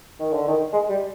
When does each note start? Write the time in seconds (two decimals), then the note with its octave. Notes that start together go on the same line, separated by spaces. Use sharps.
0.19 D#3
0.33 D3
0.47 D#3
0.73 G#3
0.89 G3